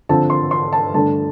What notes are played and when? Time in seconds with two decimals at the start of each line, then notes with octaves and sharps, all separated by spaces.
0.09 D3 F3 C4 A5
0.30 C6
0.51 C6
0.73 A5
0.94 G2 D3 A3 D4 A5